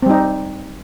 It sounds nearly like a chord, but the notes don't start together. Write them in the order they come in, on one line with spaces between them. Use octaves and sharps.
C4 G3 D#4